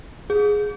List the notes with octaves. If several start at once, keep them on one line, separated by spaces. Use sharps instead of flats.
G#4